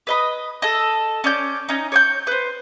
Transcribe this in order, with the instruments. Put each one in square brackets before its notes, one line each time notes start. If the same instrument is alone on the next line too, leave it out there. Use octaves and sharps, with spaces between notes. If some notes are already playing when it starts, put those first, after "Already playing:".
[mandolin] B4 D#5 B5
A4 D#5
C#4 D5 G6
C#4 D#4
C#5 D6 G6
B4 C5